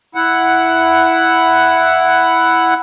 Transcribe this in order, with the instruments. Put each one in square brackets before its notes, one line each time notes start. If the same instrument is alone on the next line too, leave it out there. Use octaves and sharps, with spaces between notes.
[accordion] E4 F#5